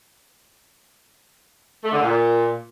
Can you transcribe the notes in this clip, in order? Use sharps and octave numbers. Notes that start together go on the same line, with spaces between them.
A3
D3
A#2